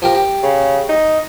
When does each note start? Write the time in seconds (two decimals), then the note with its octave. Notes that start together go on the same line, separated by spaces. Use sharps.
0.02 F3 G4 A#4
0.15 G4
0.43 C#3
0.89 D#4